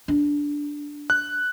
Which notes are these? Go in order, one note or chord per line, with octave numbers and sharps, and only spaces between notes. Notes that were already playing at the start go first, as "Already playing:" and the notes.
D4
F#6